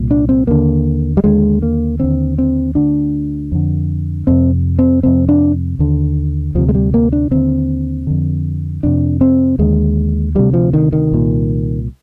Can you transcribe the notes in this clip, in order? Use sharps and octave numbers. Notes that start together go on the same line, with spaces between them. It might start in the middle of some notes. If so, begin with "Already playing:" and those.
Already playing: C2 A#2
D4
C4
D#2 D3 A#3
G3
D#2 D3 G#3
A#3
D#2 D3 C4
C4
D2 D3 D4
F2 D3
F2 C3 C4
C4
F2 C3 C4
D4
D#2 D3
D2 C3 F3
G#3
G3
A#3
D4
D#2 D3 C4
F2 D3
F2 C3 D4
C4
D#2 D3 G#3
D2 C3 G3
F3
D#3
D#3
C2 A#2